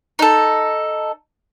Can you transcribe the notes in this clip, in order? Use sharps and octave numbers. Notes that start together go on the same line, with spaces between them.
D#4 A4